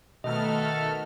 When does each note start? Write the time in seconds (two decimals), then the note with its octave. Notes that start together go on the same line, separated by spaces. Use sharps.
0.24 B2 D#3 A3 F#4 A4 D#5 F6